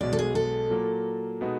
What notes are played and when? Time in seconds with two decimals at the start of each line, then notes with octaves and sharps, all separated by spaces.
0.01 B1 B2 G#3 D5
0.13 A4
0.19 G#4
0.35 A4
0.70 A#2 F#3 A#3
1.41 B2 G#3 B3 D#4 F#4